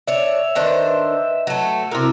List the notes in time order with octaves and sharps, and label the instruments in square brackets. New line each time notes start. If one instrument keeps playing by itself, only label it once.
[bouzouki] D4 C#5 [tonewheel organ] E5
[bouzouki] D#3 D4 C5 [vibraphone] B4 D#5
[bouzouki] F#3 A3
[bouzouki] C3 A#4 [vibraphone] C4 E4 F#4